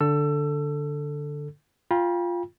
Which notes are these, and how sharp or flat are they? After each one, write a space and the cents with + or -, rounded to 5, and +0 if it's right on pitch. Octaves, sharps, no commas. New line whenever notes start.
D3 +0 A4 +5 E6 +25
F4 +0 G5 +20 B5 -40